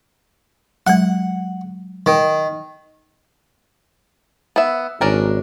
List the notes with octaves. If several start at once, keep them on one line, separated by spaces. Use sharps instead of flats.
F#3 G#3 F#5
D#3
B3 E5
G#1 C#4 D4 A#4